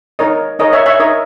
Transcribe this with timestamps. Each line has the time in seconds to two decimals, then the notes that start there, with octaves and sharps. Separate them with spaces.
0.19 D#4 A#4 C#5 D#5
0.59 D#4 A#4 C#5 D#5
0.73 C#5 E5
0.86 C#5 E5
0.99 D#4 A#4 C#5 D#5